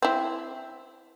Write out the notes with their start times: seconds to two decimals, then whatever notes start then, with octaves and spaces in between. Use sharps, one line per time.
0.02 C4 E4